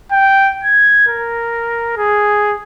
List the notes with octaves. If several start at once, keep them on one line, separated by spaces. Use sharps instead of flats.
G5
G#6
A#4
G#4